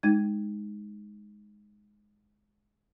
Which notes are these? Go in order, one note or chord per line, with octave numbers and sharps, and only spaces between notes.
G#3 D#4 G#6